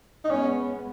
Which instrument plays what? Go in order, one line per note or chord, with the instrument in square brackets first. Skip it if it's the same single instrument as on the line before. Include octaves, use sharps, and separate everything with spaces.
[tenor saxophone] D#4
[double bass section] G#3 B3 [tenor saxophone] C#4